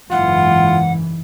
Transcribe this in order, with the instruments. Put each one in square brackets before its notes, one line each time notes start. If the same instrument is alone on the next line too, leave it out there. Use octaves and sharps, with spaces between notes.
[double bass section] F#1 G#2 E3 [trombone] F4 [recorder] F#5